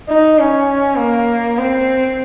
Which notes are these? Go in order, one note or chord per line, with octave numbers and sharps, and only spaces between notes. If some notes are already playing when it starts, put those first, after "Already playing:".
D#4
C#4
A#3
C4